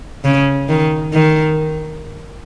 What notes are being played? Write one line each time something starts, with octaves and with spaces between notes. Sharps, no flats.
C#3
D#3
D#3